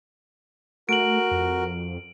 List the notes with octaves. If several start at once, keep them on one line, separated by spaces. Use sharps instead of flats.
A3 F#4 A#4 D7 F#7
F2